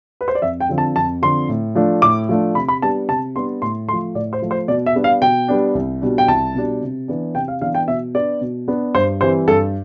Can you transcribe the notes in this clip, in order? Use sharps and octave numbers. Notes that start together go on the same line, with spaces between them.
B4
C5
D5
F2 E5
G5
D3 F3 C4
A5
F2 A5
D3 F3 C4 C6
A2
F3 A3 D4
A2 D6
F3 A3 D4
C3 B5
B5
G3 B3 D4 A5
C3 A5
G3 B3 D4 C6
A2 C6
F3 A3 C6
A2 D5
C5
F3 A3
C5
B2 D5
E5
G3 B3 D4
F5
B2 G5
G3 B3 D4
C2
B2 G3 D4
G5
C2 A5
B2 G3 D4
C3
E3 B3 D4
C3 G5
F5
E3 B3 D4 F5
G5
B2 E5
B3 D4 D5
B2
B3 D4
G2 C5
E3 G3 C4 C5
G2 A4